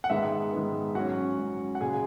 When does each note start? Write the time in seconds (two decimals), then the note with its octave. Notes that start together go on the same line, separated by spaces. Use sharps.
0.04 F#5
0.10 G#2 D#3 G#3 B3 E5
0.52 G#2 D#3 G#3 B3
0.95 G#2 F#3 C#4 F#4 F#5
1.38 G#2 F#3 C#4
1.75 F#5
1.81 F#2 C#3 G#3 G#4 G#5